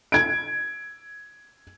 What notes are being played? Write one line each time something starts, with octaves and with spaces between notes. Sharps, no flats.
G#6 D7